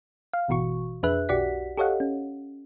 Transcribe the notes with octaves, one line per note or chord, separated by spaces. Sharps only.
F5
G#1 B2 E3 F#4 C#6
F2 D4 G#4 B4 E5 F#6
B1 F#4 G4 D5 F#5 B6
G4 A4 C#5 D#5 F5 F#5
C#4